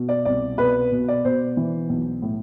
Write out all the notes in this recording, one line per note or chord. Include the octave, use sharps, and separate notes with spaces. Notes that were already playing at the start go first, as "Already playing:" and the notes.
Already playing: B2
D5
C2 D5
B2 B4
B2
D5
B2 C5
E3
B1
A2